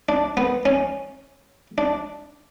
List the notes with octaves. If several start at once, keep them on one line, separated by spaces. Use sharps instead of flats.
D4
B3
C#4
D4